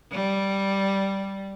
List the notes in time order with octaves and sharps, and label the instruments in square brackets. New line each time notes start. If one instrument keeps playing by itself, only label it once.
[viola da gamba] G3